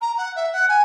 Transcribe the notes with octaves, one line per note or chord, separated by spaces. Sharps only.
A#5
F#5
E5
F#5
G#5